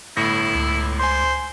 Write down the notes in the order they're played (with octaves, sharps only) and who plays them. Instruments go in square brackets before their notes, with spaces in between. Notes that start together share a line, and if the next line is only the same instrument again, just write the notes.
[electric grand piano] G1 A2 A#6 [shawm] E4
[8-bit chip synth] C#2
[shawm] C5 [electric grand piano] G#5 C6